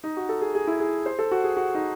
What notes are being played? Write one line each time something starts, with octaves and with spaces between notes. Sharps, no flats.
D#4
F#4
A4
G#4
G#4
E4
G#4
C5
A4
F#4
G#4
F#4
D#4